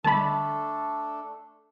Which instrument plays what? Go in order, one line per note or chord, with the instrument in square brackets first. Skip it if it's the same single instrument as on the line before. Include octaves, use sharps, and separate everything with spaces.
[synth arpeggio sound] D3 G3 D#5 [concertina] A3 D4 A4 [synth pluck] A5 B5